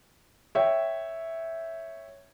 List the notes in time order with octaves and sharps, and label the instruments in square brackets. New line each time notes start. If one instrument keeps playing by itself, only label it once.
[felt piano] C#5 E5 G5